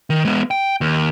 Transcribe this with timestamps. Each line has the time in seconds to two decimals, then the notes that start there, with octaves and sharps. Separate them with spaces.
0.10 D#3
0.25 G#3 B3
0.51 G5
0.81 D#2